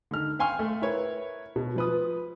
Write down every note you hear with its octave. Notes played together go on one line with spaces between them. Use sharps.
D3 D#3 F6
F5 G5 G#5 C6 C#6 F6
A3
E4 A#4 B4 C#5
B2
F3 B4 D#6